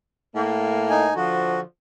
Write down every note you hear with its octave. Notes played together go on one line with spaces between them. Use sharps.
A2 A#3
D#4 G#5
D3 F3 F#4